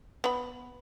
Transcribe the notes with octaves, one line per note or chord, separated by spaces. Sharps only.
B3 B5